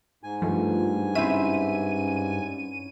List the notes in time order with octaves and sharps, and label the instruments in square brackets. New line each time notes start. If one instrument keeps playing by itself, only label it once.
[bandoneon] G#2 G#5
[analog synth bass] G2 [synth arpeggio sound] F3 A3
[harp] C4 E4 E5 [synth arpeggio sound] C#4 D#7